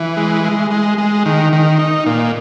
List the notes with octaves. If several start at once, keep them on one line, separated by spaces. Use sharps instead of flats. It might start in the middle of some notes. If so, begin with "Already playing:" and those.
Already playing: E3
G#3
G#3
G#3
G#3
D#3
D#3
D#4
A#2